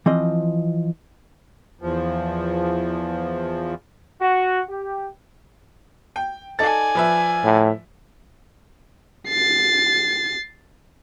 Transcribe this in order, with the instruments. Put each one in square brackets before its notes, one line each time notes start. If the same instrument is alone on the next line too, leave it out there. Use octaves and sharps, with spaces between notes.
[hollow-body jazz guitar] E3 F3 C4 D#5
[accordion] E2 F3
[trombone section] F#4
G4
[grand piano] G5
[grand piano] D#4 A4 A6 [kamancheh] D5 G#5
[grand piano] F3 B4 E5
[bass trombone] A2
[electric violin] A6 C7